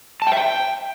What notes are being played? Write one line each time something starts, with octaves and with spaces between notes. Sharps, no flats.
A5
G5
E5
G5